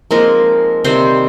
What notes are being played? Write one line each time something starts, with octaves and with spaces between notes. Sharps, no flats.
F3 G#3 A#3 C4 D#4 A#4
C3 D#3 G3 C4 C5